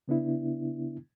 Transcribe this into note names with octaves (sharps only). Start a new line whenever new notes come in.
C#3 B3 D4 E4